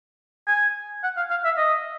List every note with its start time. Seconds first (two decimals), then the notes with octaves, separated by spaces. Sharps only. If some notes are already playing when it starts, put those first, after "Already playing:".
0.47 G#5
1.03 F#5
1.17 F5
1.30 F5
1.45 E5
1.57 D#5